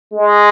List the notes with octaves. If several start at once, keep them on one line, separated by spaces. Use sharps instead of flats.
G#3